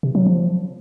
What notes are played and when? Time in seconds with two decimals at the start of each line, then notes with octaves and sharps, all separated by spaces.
0.03 C3
0.15 F#3
0.26 F3